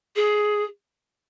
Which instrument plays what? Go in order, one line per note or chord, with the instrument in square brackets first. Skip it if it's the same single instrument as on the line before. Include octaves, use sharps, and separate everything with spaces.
[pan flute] G#4